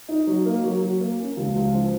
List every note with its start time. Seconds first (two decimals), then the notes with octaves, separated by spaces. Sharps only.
0.09 D#4
0.27 F#3
0.46 A#3
0.64 F#3
0.82 F#3
1.00 A#3
1.20 C#4
1.37 C#2
1.56 C#2
1.74 F3